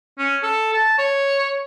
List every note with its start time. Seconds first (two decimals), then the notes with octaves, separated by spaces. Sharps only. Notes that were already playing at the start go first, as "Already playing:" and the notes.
0.19 C#4
0.43 A4
0.74 A5
0.98 C#5